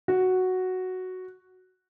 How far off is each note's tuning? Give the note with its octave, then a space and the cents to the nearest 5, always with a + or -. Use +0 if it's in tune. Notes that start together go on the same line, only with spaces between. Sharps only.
F#4 +0